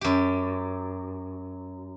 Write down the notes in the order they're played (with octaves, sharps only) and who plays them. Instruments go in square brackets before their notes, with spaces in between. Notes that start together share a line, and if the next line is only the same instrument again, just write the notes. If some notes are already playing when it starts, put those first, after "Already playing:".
[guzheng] F#2 G4